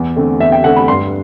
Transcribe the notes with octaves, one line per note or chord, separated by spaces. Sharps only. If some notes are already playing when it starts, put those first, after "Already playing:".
Already playing: E2
D3 A3 C4
E2 E5
G5
D3 A3 C4 F#5
B5
G2 C6